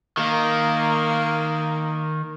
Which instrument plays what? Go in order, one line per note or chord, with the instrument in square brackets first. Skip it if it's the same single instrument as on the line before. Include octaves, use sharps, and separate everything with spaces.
[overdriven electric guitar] D#3 [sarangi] A#3